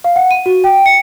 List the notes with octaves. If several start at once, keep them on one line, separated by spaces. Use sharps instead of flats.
F5
F#5
D#7
F#4
G5
C#7